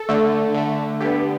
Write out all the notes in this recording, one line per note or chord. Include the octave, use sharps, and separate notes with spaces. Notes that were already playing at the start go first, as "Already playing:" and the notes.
Already playing: A4
D3 A3
D3 A3
D3 B3 G4